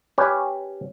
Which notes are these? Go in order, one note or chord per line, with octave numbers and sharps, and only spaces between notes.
C#4 G4 B4 C#5